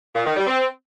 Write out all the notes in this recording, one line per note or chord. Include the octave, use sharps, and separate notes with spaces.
A#2
D#3
G3
C4